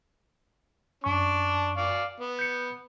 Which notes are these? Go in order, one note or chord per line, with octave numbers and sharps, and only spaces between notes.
F#2 D4 C#6
D5 F5
B3
G6 C#7